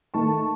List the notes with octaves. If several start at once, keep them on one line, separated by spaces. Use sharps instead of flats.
D#3 A3 A5 C#6